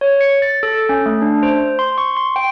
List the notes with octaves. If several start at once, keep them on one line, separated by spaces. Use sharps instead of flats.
C#5
C#7
A6
A4
C#4
A3
D4
C5
C6
C#6
C6
G5